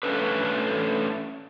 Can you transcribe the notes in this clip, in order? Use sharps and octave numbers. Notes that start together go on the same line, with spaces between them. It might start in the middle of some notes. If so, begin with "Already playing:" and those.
A3 C#4 D4 A4 B4